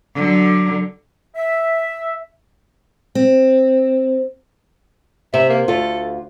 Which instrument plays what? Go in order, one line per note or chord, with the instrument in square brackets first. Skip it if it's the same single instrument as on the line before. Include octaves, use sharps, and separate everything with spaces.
[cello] D3 F#3
[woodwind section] E5
[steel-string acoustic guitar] C4
[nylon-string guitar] C3 [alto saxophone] E5
[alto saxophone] A#3
[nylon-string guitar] D2 F4 [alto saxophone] A4